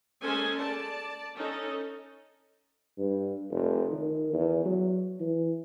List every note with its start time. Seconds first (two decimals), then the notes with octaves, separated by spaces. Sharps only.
0.22 G#3 A#3 C#4 A4 C5 G#5
0.58 D5 A5
1.36 C#4 D#4 A4
2.98 G2
3.50 F1
3.92 D#3
4.33 E2
4.65 F#3
5.20 E3